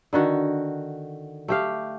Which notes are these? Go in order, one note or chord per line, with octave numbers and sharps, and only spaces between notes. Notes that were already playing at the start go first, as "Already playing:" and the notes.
D3 D#3 F#4
A3 G4 F5